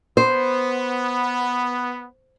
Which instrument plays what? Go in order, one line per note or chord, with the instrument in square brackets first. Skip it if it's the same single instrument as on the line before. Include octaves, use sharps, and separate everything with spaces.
[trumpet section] B3 [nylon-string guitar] C5